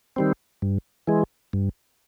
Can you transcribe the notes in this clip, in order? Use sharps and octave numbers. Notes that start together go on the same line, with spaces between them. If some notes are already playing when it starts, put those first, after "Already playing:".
D#3 G3 C4
G2
E3 G#3
G2